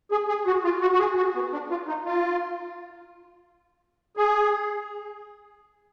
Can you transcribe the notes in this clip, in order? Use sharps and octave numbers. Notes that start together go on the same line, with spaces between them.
G#4
G#4
F#4
F4
F#4
F#4
G#4
F#4
B3
D4
F4
D#4
F4
G#4